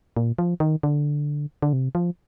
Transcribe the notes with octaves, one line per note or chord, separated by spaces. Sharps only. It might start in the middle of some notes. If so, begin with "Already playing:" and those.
A#2
F3
D#3
D3
D3
C3
F3